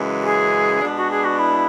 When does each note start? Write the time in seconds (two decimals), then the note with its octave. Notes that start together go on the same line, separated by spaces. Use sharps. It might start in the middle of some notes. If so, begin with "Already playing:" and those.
Already playing: F#2 C#3 E3 G#3
0.21 F#4
0.25 G#4
0.82 B2 G#3 B3 D4
0.96 F#4
1.10 G#4
1.24 F#4
1.38 E4